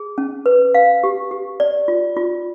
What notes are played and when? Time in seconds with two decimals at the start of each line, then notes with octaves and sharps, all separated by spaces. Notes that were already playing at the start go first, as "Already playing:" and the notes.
Already playing: G#4
0.18 C#4
0.46 B4
0.74 F5
1.03 G4
1.31 G4
1.60 D5
1.88 F4
2.17 F4